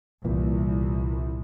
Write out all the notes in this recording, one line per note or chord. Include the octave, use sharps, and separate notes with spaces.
C2 A#2 E3